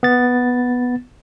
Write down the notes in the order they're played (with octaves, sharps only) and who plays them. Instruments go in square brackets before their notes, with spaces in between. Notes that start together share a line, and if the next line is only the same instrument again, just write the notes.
[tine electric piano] B3 A6